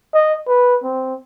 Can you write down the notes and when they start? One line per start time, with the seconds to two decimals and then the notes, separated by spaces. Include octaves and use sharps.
0.14 D#5
0.47 B4
0.84 C4